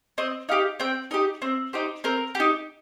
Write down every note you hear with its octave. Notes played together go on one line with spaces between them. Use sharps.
C4 D#5
D#4 G4 F5
C4 G5
D#4 G4 D#5
C4
D#4 G4 C5
C4 A#4
G4
D#4